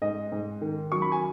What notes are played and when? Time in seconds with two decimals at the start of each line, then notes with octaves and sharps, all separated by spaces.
0.02 G#2 D#5
0.32 G#2
0.61 D#3
0.92 F#3 C#6
1.02 B5
1.12 G#5